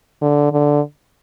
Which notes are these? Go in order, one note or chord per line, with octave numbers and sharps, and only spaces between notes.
D3
D3